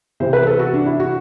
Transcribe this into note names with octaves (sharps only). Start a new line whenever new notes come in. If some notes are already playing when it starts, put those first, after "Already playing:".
C3 E3 C5
B4
A4
F#4
D4
E4
F#4